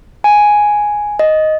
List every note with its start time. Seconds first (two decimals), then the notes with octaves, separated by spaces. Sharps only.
0.24 G#5
1.19 D#5